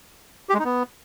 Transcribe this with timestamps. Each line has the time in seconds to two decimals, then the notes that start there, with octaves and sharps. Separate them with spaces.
0.49 G4
0.54 G#3
0.59 D#4
0.65 B3